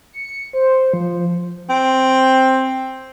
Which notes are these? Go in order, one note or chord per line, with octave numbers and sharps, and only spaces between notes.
C#7
C5
F3
C4